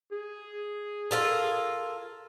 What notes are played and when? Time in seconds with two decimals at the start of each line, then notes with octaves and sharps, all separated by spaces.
0.12 G#4
1.11 F4 A4 A#4